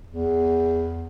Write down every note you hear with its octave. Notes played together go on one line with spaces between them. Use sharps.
E2